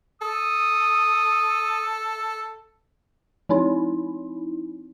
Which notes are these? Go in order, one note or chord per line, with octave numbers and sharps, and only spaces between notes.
A4 D#6
F3 C4 D#4 E4